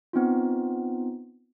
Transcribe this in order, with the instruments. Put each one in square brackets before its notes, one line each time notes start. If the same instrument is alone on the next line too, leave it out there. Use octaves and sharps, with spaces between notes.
[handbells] B3 C4 D#4 F4